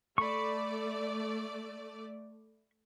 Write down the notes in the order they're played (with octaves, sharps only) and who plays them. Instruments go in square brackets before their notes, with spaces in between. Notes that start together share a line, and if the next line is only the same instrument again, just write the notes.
[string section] A3 D5 [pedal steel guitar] B5 C#6